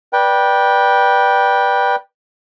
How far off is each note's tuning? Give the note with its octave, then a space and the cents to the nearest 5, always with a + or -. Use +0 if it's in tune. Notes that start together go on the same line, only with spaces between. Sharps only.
B4 -25 D5 +0 G5 +0